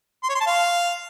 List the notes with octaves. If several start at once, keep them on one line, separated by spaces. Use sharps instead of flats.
C6
C#5
C6
A5
F5